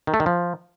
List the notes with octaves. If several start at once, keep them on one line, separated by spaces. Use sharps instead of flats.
D#3
A3
D#3
F3